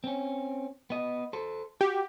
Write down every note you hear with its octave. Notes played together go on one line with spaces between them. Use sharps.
C4 C#4
B3 D#5
A4 C5
F#4 G4